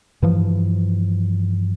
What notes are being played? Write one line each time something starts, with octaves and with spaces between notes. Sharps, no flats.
G2 E3 F3